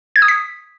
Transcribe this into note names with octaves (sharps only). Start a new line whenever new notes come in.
G#6
D#6
B6